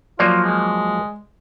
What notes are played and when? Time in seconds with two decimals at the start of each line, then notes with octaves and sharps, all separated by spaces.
0.19 F3 F#3 A#3 F4 D5
0.44 G#3